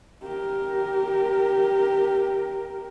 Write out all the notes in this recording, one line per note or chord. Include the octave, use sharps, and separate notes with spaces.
G4 A#4